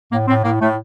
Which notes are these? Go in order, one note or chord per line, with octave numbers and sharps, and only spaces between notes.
A2 A#3
A2 C4
A2 A#3
A2 A3